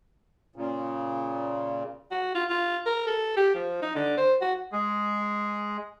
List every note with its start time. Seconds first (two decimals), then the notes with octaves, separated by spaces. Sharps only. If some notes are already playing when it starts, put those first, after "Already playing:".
0.56 A#2 C#3
2.11 F#4
2.35 F4
2.50 F4
2.86 A#4
3.07 A4
3.37 G4
3.54 F3
3.82 D#4
3.95 D3
4.17 C5
4.41 F#4
4.72 G#3 G#4